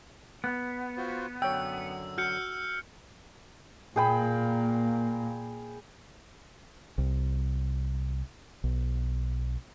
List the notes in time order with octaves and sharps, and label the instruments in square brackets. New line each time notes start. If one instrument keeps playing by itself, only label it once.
[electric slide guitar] B3
[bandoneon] F4 F#4 C5
[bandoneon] F#2 D3 F#3 [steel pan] C#5 G5 [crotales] E6
[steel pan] F#4 [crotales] F6 G6 C#7
[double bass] A#2 A#3 [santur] G#4 G5 B5
[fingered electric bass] C2
B1